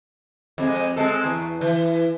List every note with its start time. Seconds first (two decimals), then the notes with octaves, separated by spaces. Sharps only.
0.58 F2 G#3
0.96 G#3 C4 A4
1.24 E2
1.61 E3